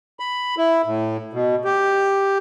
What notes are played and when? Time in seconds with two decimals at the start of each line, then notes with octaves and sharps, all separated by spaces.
0.20 B5
0.58 E4
0.86 A2
1.33 B2
1.64 G4